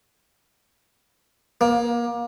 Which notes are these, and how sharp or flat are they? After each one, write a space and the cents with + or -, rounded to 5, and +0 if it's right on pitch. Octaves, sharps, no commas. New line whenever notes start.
A#3 +25